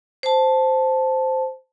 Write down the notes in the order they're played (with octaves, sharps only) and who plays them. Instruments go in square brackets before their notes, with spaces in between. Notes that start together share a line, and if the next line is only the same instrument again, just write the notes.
[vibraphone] C5 A5